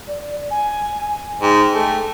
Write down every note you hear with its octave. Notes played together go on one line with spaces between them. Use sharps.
D5
G#5
G#2 G5
A3